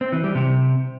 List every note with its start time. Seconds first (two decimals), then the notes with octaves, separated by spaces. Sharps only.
0.01 C4
0.12 E3
0.24 G3
0.35 C3